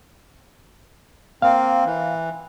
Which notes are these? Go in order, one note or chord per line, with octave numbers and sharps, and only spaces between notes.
A#3 C4 F5
E3